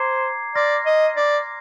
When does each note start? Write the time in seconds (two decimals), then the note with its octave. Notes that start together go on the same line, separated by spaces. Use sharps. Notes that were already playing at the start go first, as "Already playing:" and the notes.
Already playing: C5 A#5 D6 G#6 C7
0.55 D5 C6 F6 A#6
0.86 D#5
1.16 D5